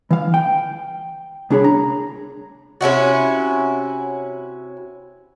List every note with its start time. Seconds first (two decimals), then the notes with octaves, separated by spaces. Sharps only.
0.11 E3 F5
0.34 G5
1.50 C2 D4 G#4 C#5 B5
1.64 A#5
2.81 C3 C#4 E4 F#4